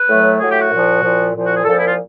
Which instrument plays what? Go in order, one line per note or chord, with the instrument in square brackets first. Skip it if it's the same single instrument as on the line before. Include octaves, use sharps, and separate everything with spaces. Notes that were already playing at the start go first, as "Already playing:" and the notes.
Already playing: [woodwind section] B4
A2 F#3 A3
A2 F#3 A3 G#4
G4
F#4
C2 A#2 F3
C2 A#2 F3
C2 A#2 F3
F#4
G#4
C2 A#2 F3 A4
E4
F4